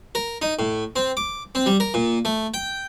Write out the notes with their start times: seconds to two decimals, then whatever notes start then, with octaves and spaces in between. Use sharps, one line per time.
0.15 A#4
0.42 D#4
0.59 A2
0.96 C4
1.17 D6
1.55 C4
1.66 G3
1.80 A#4
1.94 A#2
2.25 A3
2.54 G5